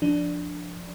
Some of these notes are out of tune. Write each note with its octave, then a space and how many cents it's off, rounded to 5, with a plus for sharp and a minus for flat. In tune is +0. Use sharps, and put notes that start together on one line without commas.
F3 +0 D4 +0